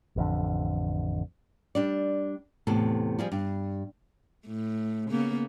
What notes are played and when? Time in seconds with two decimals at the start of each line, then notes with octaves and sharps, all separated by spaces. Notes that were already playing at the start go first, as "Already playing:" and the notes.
0.16 A1 F2 D3
1.75 G3 D4 D5
2.67 E2 A2 C3 A4
3.19 F3 G3 G#4
3.32 G2
4.46 A2
5.11 C#3 A#3 B3